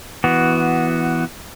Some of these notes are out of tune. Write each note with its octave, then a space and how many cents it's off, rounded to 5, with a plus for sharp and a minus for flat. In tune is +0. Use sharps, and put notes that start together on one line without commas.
E3 +0 B3 +0 F#4 +0